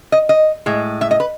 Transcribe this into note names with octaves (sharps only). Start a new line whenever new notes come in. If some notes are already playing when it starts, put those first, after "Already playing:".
D#5
D#5
A2 G#3
E5
D#5
B4